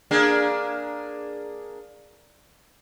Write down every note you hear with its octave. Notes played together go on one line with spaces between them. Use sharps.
A#3 D4 G#4